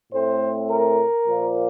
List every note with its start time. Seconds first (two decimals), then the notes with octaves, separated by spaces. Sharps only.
0.12 A2 A3 C4 C5
0.69 A#4
1.26 A#2 F3 A#3